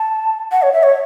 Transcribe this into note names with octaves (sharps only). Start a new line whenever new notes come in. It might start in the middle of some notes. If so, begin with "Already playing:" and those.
Already playing: A5
F#5
C#5
E5
C#5